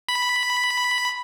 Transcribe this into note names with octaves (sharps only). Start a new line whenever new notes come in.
B5